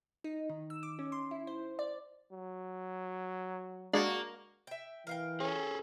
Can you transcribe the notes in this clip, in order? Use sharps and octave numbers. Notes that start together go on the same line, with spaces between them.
D#4
D#3
E6
D6
C#4
C6
E4
C5
D5
F#3
G#3 A#3 D4 F#4
E5 G5
E3 A#4 F5 G5
C#4 G#4 A4